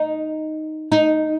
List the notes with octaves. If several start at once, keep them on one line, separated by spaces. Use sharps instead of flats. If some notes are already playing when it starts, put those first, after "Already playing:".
Already playing: D#4
D#4